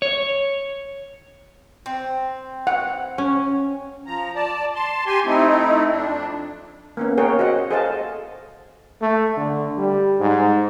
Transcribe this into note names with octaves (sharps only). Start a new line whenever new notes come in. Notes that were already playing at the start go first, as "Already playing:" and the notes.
C#5
C4
F#5
C#4
F3 A#5
D5 A5
A5 C6
G4 G#5 C6
A3 C4 D#4 E4
F2 D4
A#3 B3 C#4
A#3 G#4 A#4 C#5 F#5 G5
F#4 C5 D#5 F#5
G#4 A4 C5 D#5 F5 A5
A3
D3
G3
G#2